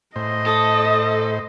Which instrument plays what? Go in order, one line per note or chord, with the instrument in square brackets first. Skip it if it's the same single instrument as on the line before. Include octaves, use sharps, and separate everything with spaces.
[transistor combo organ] A2 C5 [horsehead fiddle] D#5
[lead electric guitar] A4 [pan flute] D#6